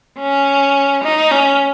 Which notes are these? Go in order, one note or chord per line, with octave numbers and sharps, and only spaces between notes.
C#4
D#4
C#4